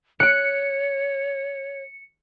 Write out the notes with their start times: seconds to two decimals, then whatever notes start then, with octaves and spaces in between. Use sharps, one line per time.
0.20 C#5 F#6 C#7 D7